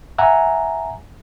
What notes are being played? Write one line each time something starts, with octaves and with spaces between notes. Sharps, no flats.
E5 F#5 G#5 A#5